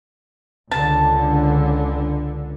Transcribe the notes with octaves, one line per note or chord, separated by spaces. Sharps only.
C#2 D3 A5